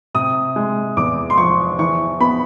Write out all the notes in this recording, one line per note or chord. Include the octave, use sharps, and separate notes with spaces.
C3 D#6
G#3
E2 D6
C6
F3 C#6
E3 C#6
B3 B5